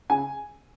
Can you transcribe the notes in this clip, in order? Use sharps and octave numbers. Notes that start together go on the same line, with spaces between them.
C#3 G#5